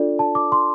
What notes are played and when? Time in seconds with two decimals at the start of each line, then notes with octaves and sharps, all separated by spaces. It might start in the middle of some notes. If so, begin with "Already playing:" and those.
Already playing: D4 F4 A4 D5
0.19 A5
0.35 D6
0.52 C6